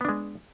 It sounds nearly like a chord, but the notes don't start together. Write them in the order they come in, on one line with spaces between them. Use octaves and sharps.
B3 D4 G#3